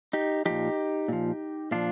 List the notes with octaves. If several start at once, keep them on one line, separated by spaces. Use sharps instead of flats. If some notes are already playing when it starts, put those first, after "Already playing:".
D#4 G4
A#2 F3 D#4 G4
A#2 F3
A#2 F3 D4 F4